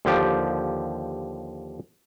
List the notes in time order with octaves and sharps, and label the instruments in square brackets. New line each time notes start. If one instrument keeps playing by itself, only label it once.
[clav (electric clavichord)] D#2 D3 F3 G4